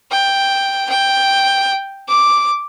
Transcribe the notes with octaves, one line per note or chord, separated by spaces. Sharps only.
G5
G5
D6